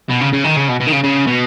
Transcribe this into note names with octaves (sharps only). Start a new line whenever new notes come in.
B2
C#3
C#3
D#3
C#3
B2
B2
D#3
C#3
C#3
B2